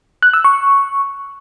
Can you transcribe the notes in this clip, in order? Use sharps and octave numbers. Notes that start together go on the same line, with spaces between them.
F#6
E6
C#6